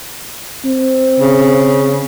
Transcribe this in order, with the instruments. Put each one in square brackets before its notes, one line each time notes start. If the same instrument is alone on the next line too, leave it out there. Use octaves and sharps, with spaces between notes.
[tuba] C4
[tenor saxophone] C#3